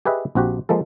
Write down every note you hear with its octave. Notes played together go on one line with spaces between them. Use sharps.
G4 G#4 B4 D#5 E5
A#1 C4 F#4 G4
F3 G#3 A#3 A4